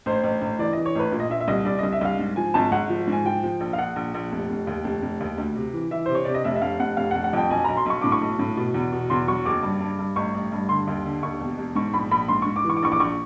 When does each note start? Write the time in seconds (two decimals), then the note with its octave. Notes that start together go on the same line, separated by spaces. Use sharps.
0.06 A1 C5
0.24 A1
0.42 A1
0.59 E3 D5
0.73 E3 D#5
0.86 C#5
0.95 A1 B4
1.12 A#2
1.20 D#5
1.30 A#2 E5
1.40 E5
1.48 C2 D#5
1.65 C2 D5
1.79 C2 D#5
1.92 E5
2.01 C2 F5
2.19 G#2
2.36 F3 G#5
2.54 G#1 A5
2.72 G#1 F#5
2.90 F3
3.07 G#2 G#5
3.25 F3 G5
3.43 F3
3.60 A#1
3.73 F5
3.78 A#1 F#5
3.96 A#1
4.14 A#1
4.32 F1
4.49 F1
4.67 D#2
4.84 F1
5.02 F1
5.20 D#2
5.38 D2
5.55 C3
5.73 E3
5.91 E3 E5
6.06 C3 C5
6.15 C#5
6.25 C3 D5
6.34 D#5
6.44 F1 E5
6.56 E5
6.62 F1 F5
6.80 F1 F#5
6.97 F1 F5
7.11 F#5
7.15 F1
7.24 F#5
7.33 F2 G5
7.50 B1 G#5
7.64 B1 A#5
7.77 C6
7.86 B1 C#6
8.01 A2 D6
8.12 C#6
8.21 B1
8.39 A2
8.57 B2
8.74 E2
8.92 B2
9.10 E2 C6
9.27 F#3 C#6
9.45 F#1 D6
9.63 G2
9.80 G2
9.99 G2
10.16 A1 C#6
10.34 A1
10.52 G2
10.69 D3 C6
10.87 D#2
11.05 D3
11.23 D#2 C#6
11.40 E1
11.58 E1
11.75 G#2 C#6
11.94 A#1 B5
12.11 A#1 B5
12.28 G#2 C6
12.42 G#2 C#6
12.56 D6
12.64 E3 C#6
12.76 D6
12.82 A#1 C#6
12.92 D6
13.00 A#1 C#6